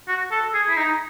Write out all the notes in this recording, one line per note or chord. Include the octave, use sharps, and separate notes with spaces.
F#4
A4
G#4
E4
D#4